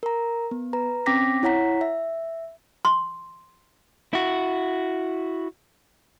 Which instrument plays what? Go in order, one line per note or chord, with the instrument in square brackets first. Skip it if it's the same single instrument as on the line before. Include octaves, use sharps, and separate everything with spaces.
[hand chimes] A#4 A#5
B3
B4 A#5
C4 C#4 G5 D6 A#6 B6
E4 C#5 F#5 A#5 B6
E5
[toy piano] C6
[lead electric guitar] E4 F#4